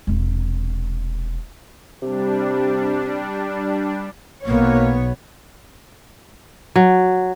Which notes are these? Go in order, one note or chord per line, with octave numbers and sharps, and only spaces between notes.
E1 C3
C3 G3 D4
B1 A#3 B3 C#5
F#3